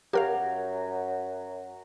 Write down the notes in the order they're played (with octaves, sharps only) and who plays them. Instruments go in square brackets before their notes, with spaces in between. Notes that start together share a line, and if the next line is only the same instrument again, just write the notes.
[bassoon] F#2 [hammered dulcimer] F#3 [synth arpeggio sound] G4 A#4 F5